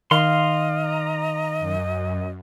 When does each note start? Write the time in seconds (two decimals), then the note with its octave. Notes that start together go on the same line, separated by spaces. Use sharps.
0.11 D#3 D#5 F5 C6
0.80 A#5
1.59 F#2